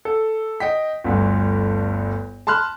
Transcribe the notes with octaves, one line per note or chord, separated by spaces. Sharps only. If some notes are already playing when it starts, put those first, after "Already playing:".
A4
D#5 G5 B6
G1 D2 G2
A5 B5 C6 F6 F#6